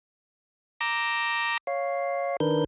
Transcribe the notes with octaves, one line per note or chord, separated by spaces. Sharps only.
A#5 D6 E6 G6 A#6
C#5 F5
D#3 D4 A#4 B4 G6